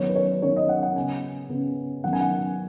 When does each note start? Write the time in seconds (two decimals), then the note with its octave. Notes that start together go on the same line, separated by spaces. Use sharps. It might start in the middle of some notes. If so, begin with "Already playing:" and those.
Already playing: D#3 F#3 B3 C#5
0.09 B4
0.15 C#5
0.42 D#3 F#3 B3 C#5
0.56 D#5
0.69 F#5
0.83 F#5
0.96 C#3 B3 G#5
1.49 C#3 B3
2.04 D#3 F#3 B3 F#5
2.13 G#5
2.21 F#5